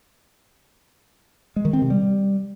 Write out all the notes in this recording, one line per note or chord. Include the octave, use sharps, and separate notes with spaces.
G#3
D#3
C4
C3
G3